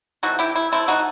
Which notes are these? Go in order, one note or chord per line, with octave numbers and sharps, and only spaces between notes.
C3 E3 A3 D#4 F#4
E4 G4
E4
C3 E3 A3 C4 E4
D#4 F#4